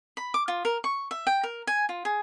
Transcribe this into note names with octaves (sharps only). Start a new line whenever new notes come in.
B5
D6
F4
A#4
C#6
E5
G5
A#4
G#5
F4
G#4